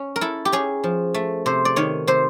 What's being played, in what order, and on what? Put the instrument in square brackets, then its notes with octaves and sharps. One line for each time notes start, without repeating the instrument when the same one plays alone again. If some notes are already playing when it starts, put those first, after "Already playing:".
Already playing: [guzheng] C#4
A#4
E4 A4
G4
C#4 G#4
F3
A3
C3 C5
D5
D#3 C#5
C3 C5